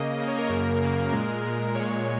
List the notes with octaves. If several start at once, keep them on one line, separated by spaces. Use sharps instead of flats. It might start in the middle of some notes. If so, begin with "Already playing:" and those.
Already playing: C#3 A#3 D#5
C#3 A#3
C#5
A#4
F#2 C#3 A#3 A#4
F#2 C#3 A#3
A#2 G#3
A#2 G#3
A#2 G#3 C#5